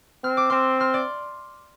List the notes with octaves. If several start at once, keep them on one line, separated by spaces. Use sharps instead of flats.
C4 F6
D6
C4 C6 F6
C6 F6
D5